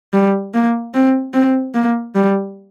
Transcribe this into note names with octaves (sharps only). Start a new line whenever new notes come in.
G3
A#3
C4
C4
A#3
G3